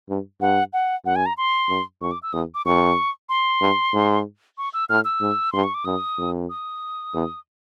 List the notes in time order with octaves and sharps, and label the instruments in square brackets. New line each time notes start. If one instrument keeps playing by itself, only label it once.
[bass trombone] G2
[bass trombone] G2 [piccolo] F#5
[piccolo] F#5
[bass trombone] F#2 [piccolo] F#5
[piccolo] G#5
A#5
C6
[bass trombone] F#2
[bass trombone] F2 [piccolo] C#6
[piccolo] D6
E6
[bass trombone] E2 [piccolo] D#6
[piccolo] D6
[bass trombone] F2 [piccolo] C#6
[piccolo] C6
[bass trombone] G2
G#2
[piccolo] C#6
E6
[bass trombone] A2 [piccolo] F6
[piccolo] E6
[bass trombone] G#2
[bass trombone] G2 [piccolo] C6
[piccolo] C#6
D6
[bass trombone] F#2 [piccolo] D#6
[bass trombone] F2
[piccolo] D#6
[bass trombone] E2